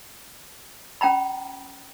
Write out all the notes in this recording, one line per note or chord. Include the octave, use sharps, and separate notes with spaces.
C#4 G5 A#5 B5